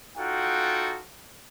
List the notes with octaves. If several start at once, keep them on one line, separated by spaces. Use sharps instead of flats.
D#4 F4 F#4 A4 F#5 G5